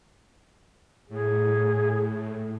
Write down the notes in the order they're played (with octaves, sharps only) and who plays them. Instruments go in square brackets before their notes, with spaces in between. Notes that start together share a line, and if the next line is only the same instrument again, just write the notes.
[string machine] A2 [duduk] G#4